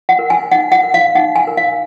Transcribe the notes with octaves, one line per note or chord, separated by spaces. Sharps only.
F#5
A#4
G#5
D#4 F#5
F#5
A#4
F5
D#4 F#5
G#5
A#4
F5